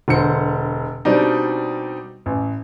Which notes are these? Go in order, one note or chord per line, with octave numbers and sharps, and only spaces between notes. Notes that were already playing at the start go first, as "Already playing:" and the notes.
E1 D3 C5 C#7
B2 G3 C4 D4 D#4
A1